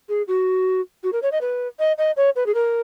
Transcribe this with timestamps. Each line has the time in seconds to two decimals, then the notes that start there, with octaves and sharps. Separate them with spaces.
0.09 G#4
0.28 F#4
1.03 F#4
1.13 A#4
1.23 C#5
1.32 D#5
1.41 B4
1.79 D#5
1.98 D#5
2.17 C#5
2.36 B4
2.46 G#4
2.54 A#4